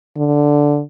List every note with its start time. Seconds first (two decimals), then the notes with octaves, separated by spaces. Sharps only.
0.17 D3